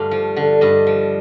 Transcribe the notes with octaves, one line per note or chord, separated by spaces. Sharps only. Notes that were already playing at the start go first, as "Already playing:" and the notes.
Already playing: G2 D3 A3 F5
F3
D3
G2 D#5
F3